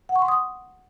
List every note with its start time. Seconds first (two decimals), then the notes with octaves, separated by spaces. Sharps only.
0.09 F#5
0.16 C#6
0.22 C6
0.28 D#6